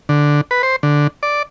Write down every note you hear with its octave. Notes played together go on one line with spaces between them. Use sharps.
D3
B4
C5
D3
D5